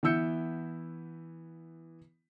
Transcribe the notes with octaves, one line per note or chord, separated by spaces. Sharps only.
E3 B3 E4 E6 G6 C#7